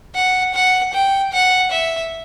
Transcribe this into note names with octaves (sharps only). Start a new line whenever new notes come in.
F#5
F#5
G5
F#5
E5